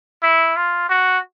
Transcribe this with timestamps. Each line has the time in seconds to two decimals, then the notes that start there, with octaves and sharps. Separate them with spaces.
0.23 E4
0.56 F4
0.89 F#4